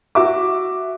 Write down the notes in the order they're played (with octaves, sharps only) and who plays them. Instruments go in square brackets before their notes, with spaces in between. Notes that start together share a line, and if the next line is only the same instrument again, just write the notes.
[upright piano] F#4 E5 D6